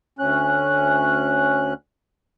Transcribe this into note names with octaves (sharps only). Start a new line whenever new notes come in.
D2 C#4 F#6